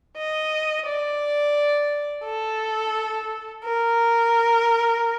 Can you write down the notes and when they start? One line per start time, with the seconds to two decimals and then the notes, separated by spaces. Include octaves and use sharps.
0.17 D#5
0.86 D5
2.24 A4
3.64 A#4